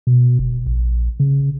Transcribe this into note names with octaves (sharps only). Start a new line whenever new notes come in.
B2
F1
A#1
C#3